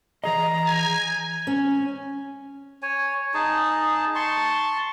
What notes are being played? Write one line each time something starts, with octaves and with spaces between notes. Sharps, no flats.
E3 G#4 D#5 A#5
G#5
C#4
C#5 G#5
D#4 G#4 A5
A5 C6 C#6